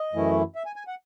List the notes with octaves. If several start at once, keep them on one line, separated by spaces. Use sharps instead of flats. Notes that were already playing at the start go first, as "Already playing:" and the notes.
Already playing: D#5
F#2 E3 A3 C#4 E4
E5
G#5
G#5
F#5